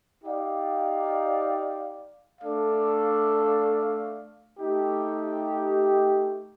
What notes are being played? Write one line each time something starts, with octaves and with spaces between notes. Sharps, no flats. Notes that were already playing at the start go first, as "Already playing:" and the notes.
D#4 G4 D5 F5
A3 D4 A4 D5 F5
A3 D#4 G4